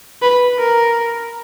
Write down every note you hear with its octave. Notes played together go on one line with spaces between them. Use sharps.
B4
A#4